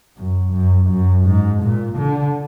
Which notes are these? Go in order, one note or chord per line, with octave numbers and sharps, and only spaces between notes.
F#2
F#2
F#2
G#2
A#2
D3